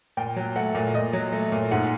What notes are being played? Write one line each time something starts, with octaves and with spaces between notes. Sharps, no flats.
A#2 G5
F#3
A3 F#5
A#2
A#2 D#5
F#3
A3
A#2
G#2 F#5